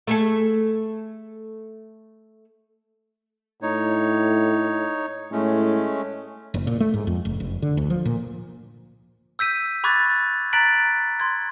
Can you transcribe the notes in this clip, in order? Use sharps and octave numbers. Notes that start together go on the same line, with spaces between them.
A3 G#4 A4
A2 D#4 C#5
A2 G#3 A3 C#4
F#1
A#2
A3
G#2
F2
F1
F1
D3
D2
F3
A#2
E6 G6 B6 D#7
B5 C#6 D6 F#6 G#6 A6
A#5 F#6 A6 B6 D7 F#7
C6 G#6